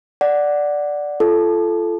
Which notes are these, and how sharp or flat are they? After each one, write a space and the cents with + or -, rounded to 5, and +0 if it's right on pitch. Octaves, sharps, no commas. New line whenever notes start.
D5 +0 F#5 +0
F4 -30 A4 -15